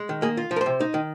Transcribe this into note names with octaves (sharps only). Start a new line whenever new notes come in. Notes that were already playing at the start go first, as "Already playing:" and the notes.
Already playing: G#3
D#3
A#3 G#4
F4
F3
A#4
C5
C3
D#4
D#3